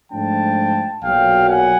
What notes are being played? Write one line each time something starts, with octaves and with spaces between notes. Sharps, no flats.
G#2 F3 A3 D4 G5 A5
B1 A#2 F#3 A#3 F5 G5
F#5 G#5